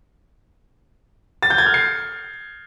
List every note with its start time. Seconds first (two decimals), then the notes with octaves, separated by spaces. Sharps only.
1.43 A6
1.50 G6
1.58 G#6
1.66 F6
1.74 C7